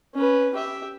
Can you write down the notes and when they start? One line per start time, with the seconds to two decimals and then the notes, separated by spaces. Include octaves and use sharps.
0.15 C#4 B4
0.55 G4 E5